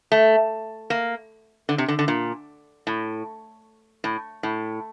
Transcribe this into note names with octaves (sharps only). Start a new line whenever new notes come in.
A3
A#3
D3
C3
D3
D3
A#2
A2
A2
A2